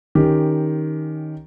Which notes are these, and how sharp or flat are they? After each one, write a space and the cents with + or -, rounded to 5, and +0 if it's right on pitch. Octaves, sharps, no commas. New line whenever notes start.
D#3 +0 C#4 +0 G4 +0